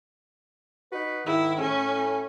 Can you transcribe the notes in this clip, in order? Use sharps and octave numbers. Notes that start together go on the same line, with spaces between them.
D#4 F#4 B4
G#2 D#3 E4
A2 C#4 G#5